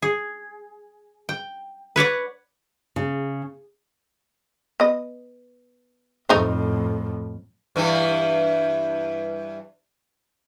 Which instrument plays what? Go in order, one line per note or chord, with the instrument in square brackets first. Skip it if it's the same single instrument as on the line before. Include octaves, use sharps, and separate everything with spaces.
[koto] G#4
G5
B4 C#5 D5 F#5
[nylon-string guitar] C#3
[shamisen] B3 D#5
[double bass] F2 A2 [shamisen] A3 D#4 C5
[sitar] G2 E3